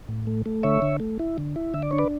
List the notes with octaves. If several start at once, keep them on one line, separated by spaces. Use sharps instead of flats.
A2
A3
A3
D3 C#5 E5
D3
A3
E4
D3
E4
D3 E5
D5
D4 C#5
B4 D5